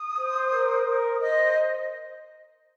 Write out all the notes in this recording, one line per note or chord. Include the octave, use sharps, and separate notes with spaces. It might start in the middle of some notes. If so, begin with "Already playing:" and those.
Already playing: D#6
C5
A#4
A#4
C5 D#5